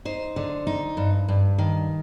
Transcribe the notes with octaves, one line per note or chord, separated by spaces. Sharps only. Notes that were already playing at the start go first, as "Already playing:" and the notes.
D#4 C5
D3
D#4
G2
G2
D#3